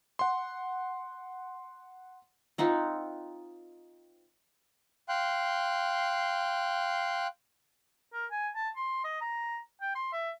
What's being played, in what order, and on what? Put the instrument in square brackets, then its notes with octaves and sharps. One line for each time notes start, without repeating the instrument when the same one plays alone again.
[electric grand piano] F#5 C6
[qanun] C4 D#4 F4 F#5
[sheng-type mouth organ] F5 G5 C6 F#6
[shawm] A#4
G#5
A5
C6
D#5
A#5
G5
C6
E5